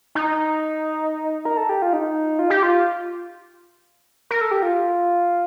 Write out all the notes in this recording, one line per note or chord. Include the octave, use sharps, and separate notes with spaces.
D#4
A#4
A4
G4
F4
D#4
F4
G4
F4
A#4
A4
G4
F4